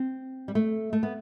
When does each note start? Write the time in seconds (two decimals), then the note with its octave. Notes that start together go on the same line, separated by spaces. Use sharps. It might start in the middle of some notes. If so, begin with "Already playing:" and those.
Already playing: C4
0.48 G3
0.55 A3
0.93 A3
1.03 B3